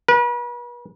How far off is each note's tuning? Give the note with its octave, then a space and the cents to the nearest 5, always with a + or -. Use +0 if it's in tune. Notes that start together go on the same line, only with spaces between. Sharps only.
B4 -40